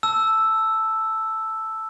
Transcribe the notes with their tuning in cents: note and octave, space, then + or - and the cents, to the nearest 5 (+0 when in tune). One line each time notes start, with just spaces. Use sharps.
A5 +0 E6 +0